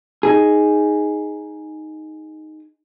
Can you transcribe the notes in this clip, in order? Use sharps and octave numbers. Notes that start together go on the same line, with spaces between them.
D#4 G#4